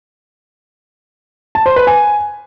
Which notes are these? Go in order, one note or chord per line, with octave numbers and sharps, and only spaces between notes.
A5
C5
B4
G#5